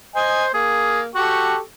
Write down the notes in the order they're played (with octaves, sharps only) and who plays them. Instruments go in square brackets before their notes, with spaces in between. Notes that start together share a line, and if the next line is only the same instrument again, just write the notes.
[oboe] C5 [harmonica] D#5 G#5
[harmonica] A#3 [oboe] G#4
[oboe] F#4 [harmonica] G4 A4 C#6